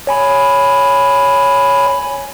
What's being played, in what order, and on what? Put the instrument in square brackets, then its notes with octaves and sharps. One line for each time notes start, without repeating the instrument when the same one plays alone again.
[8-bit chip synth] C#5 G#5 B5